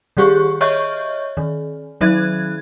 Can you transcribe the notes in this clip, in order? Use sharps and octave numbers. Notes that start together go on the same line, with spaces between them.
D#3 G3 G4 G#4 C#6
C#5 D#5 E5 C#6 F6 G6
D#3
D#3 F#3 E5 F#6 G#6